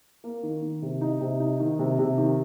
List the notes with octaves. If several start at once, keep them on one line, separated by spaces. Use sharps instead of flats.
A#3
D#3
D#3
C3
D#4
C3
D#4
D#3
C3
C3
D#3